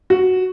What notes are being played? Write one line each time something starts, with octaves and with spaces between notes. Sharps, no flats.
F#4